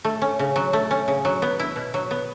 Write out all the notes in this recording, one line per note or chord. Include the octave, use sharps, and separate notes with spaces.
A3
C#4
C#3
F#3
A3
C#4
C#3
F#3
B3
E4
B2
F#3
B3